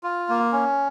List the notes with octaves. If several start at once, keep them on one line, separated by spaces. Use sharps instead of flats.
F4
A#3
C#4